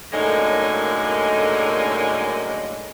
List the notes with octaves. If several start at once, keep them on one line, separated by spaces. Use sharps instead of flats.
F#2 A2 D3 G#3 A#3 D#4